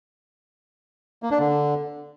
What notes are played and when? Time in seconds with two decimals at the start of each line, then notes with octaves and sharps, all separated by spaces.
1.23 A#3
1.31 D4
1.39 D3